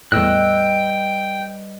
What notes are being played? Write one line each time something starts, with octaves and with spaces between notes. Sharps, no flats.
E2 A2 G3 B4 D#5 G5 E6 F#6